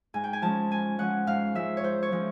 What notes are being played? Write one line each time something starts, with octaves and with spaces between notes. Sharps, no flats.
G#2 G#5
G5
G#5
F3 G#3 C#4 A5
G#2 G#5
F3 G#3 C#4 F#5
G#2 F5
F3 G#3 C#4 E5
C#5
G#2 C5
C#5
F3 G#3 C#4